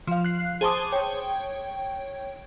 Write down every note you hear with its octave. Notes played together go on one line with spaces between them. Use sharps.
F3 F5
F#6 C7
G#4 C5 A5 C6 D6 D#6
C#5 G5